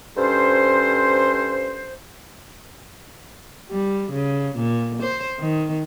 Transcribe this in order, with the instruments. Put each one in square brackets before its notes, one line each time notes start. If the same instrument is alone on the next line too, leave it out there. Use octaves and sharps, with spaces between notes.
[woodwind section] G2 C#4 A4 C5
[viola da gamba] G3
C#3
A#2
C5
D#3